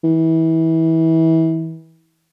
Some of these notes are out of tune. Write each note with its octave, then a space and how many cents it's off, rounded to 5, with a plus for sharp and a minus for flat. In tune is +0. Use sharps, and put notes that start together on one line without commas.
E3 -30